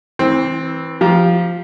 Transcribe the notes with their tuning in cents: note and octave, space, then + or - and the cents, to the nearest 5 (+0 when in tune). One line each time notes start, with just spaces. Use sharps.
E3 -20 C4 +10
F3 -5 G4 +0 A#5 +20